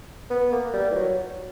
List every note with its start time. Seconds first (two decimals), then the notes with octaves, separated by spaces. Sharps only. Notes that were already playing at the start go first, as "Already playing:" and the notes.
0.30 B3
0.52 A#3
0.74 G3
0.91 E3
0.95 F#3